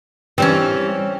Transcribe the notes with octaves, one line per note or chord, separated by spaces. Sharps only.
E3 G3 C4 C#4